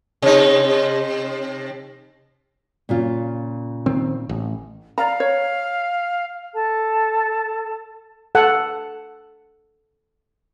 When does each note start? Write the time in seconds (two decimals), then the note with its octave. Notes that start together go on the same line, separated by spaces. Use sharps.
0.22 C3 D#4
2.89 A#2 C#3 F4
3.86 D#3 C4
4.29 A1
4.98 D5 F5 A#5
5.20 C#5
6.54 A4 A5
8.35 A4 F#5